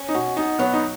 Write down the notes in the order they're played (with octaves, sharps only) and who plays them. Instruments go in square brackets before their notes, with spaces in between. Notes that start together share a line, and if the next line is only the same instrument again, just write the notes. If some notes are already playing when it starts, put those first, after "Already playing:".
Already playing: [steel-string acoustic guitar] C#4
[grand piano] D#4
[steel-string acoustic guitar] B2 [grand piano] F#4
[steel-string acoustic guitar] B2 [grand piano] D#4
[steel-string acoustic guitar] F#3 [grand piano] B3
[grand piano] D#4